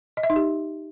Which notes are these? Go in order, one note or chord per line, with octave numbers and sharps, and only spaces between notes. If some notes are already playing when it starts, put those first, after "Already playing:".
D#5
E5
D#4
G4